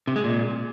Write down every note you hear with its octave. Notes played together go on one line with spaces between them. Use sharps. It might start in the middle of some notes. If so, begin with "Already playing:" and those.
C3
G#3
A#2